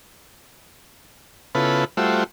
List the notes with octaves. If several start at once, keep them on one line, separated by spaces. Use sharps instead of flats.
C#3 B3 E4 F4 A4 B4
G3 A3 F4 F#4 C5 E5